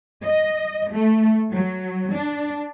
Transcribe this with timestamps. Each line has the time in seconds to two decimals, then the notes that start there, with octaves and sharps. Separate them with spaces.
0.25 D#5
0.92 A3
1.50 F#3
2.13 D4